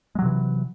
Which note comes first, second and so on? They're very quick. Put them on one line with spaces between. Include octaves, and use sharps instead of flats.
G#3 F#3 C3 E3